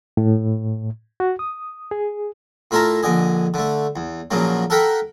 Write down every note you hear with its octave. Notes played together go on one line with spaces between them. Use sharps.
A2
F#4
D#6
G#4
A2 E4 F4 A#4 A5 A#5
A#1 D3 D#5 G#5
D3 A3
E2
A#2 C#3 F3 F#3 A#3
A4 A#4 F#5 G5 B5